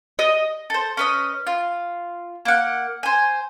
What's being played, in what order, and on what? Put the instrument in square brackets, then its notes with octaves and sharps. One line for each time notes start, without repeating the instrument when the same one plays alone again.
[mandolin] D#5
A4 C5
C#4 B4 D#5
F4
A#3 F#5
C5 G#5